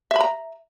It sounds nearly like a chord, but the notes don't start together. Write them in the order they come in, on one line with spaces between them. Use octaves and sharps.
E5 B5 A#5